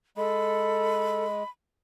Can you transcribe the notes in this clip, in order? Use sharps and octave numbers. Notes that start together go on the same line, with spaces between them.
G#3 A4 B5